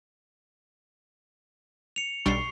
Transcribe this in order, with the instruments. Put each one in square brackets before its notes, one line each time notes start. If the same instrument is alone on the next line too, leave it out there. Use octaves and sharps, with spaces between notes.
[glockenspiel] C#7 F7
[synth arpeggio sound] B1 G3 D4 [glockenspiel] C#6 C7